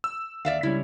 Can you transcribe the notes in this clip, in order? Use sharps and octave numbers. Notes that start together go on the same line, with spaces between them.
E6
D#2 D5 E5 F5
C#2 G3 C#4 E4